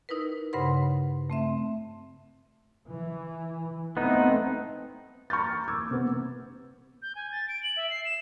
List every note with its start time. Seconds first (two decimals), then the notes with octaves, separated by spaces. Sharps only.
0.09 D#4 E4 A#4 B4
0.53 G2 C#3 B4 C5 F#5 C6
1.30 A3 C4 E5
2.89 E3
3.97 A3 B3 C4 D#4
5.30 A#5 C#6 F6 G6 A6
5.68 D6 E6 G#6
5.91 C3 B3
7.02 G6
7.15 G#5
7.32 A6
7.49 D7
7.63 F#7
7.77 E5
7.90 C7
8.05 E7